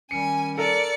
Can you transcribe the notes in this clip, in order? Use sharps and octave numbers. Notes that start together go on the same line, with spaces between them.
D#3 G3 C#4 G#5 C#7
A4 A#4 D5 C#7